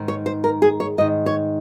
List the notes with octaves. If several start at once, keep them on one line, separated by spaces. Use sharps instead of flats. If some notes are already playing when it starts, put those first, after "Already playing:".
Already playing: G#2 D#3
C#5
C5
A#4
G#4
C#5
G#2 D#3 D#5
C#5